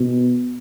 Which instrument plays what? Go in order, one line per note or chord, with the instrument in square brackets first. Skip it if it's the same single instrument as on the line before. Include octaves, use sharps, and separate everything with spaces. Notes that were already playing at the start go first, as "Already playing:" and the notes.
Already playing: [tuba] B2